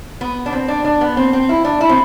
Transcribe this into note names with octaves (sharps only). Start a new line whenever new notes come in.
B3
D4
C4
D4
D4
B3
C4
C4
E4
D4
E4
C4